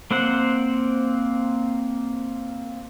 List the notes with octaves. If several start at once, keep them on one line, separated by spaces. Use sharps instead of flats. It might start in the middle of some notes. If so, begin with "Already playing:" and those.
A#3 C4 C5 F#5